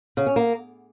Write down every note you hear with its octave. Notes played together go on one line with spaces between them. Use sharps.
C#3
C#4
A#3